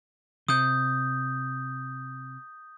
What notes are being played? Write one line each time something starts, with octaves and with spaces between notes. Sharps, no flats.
C3 D#6 G6